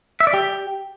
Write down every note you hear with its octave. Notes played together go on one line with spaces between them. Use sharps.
E5
D5
G4